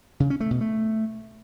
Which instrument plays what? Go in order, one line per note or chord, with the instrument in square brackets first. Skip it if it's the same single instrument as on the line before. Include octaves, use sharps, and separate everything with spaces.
[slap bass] C#3
C#4
A3
B2
A3